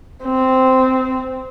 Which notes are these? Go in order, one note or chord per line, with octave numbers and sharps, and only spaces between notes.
C4